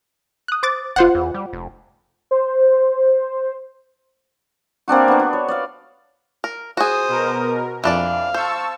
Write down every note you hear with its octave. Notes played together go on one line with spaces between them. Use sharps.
D#6 F#6
C5 D6 A6
F1 F4 C5 F#5
E2
G3
F1
C5
A#3 C4 D4 F#4
B3 D4
F#4
C#5
D5 F5
A#4
F#4 G#4 C5 D#6
B2 A#4
F2 E3 D4 D5 F5
C5 A5 C#6 E6